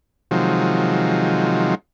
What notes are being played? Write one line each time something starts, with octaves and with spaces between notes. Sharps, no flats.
C3 D#3 F3 F#3 G#3